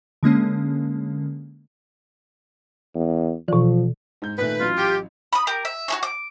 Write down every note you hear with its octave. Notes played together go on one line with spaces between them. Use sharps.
D3 G#3 A#3 C#4
E2
B2 E3 F3
G#2 G6
A#2 D#3 A3 B4
A1 F#3 F4
G4
B5 D#6
G4 A#4
E5
F#4 G#4 C#5
D6